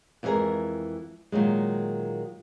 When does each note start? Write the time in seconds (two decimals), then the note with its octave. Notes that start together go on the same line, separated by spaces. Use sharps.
0.23 F2 E3 G#3 C#4 G#4 A#4
1.32 A#2 D#3 F#3 G#3